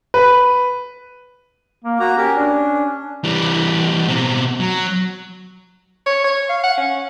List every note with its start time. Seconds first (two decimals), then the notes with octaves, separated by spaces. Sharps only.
0.14 B4
1.84 A#3
2.00 A#3 F#4 A#5
2.17 C#4 G4 A#4
2.36 D4
3.24 E3 G3
4.08 B2 C4
4.60 F#3
6.06 C#5
6.24 C#5
6.49 F5
6.63 F#5
6.77 C#4